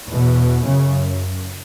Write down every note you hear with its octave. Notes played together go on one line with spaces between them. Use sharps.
E2 B2
F#2 C#3